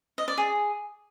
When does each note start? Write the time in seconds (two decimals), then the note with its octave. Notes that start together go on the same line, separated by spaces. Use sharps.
0.18 D#5
0.28 D5
0.38 G#4